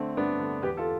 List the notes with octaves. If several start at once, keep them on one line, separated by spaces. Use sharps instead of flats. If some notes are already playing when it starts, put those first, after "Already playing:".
Already playing: D3 A3 C4
G2 B3 D4
D3
E2 G4 B4
F4 A4